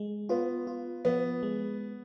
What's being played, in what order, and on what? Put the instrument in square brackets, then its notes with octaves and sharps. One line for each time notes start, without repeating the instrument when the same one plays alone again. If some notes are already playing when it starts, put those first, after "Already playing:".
Already playing: [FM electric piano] G#3
[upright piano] B3 [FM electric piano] F4
[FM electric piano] F4
[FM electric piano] F3 [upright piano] B3
[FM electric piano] G#3